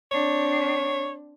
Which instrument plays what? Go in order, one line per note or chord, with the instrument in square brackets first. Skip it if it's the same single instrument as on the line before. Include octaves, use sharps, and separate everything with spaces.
[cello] C4 D4 [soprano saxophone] C#5